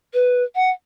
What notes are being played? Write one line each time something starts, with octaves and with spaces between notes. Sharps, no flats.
B4
F#5